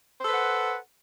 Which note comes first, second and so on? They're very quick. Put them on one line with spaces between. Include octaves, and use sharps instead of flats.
C5 A4 B4 F#5